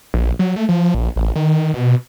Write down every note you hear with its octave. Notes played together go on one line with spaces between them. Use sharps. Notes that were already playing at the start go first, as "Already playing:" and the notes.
A#1
F#3
A3
F3
A#1
A1
D#3
B2